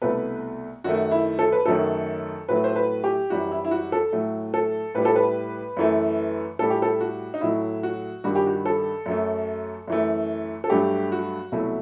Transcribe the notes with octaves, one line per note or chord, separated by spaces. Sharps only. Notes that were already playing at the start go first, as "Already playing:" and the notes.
C2 B2 A3 B4
F#2 D#3 A3 F#4
E4
A4
B4
F#2 D#3 F#3 A3 A4
A2 F#3 A3 B4
C5
B4
G4
F#2 E3 G3 F#4
E4
E4
F#4
A4
A2 F#3 A3
A4
A2 G3 B4
A4
B4
F#2 E3 A3
A2 G3 A4
G4
A4
F#4
D#4
A2 F#3 A3 E4
F#4
G2 D#3 G3 F#4
G4
F#4
A4
F#2 F#3 A3
F#2 E3 A3
A4
G2 F#3 A3 G4
F#4
C2 B2 F#3 A3 E4